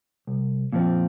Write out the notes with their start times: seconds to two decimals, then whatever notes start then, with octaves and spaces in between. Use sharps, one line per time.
0.27 C2
0.73 A#2 F3 C4